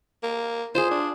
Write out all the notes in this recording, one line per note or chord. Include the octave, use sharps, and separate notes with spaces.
A#3
F4 G#4 C5
D4